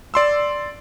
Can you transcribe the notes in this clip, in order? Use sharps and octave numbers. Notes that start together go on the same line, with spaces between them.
D5 C6 E6